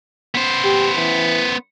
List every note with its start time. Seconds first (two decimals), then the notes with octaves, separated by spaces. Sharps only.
0.35 B3 C5
0.64 G4
0.96 E3